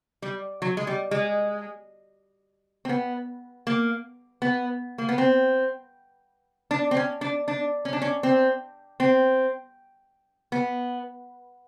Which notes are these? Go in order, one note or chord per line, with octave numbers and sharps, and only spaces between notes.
G3
F#3
G#3
G3
G#3
C4
B3
A#3
B3
A#3
B3
C4
D4
C4
C#4
D4
D4
C#4
D4
C#4
C4
C4
B3